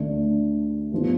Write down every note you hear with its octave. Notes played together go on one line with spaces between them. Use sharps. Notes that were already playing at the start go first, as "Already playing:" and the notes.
Already playing: D2 D3 A3 D4
G2 F3 B3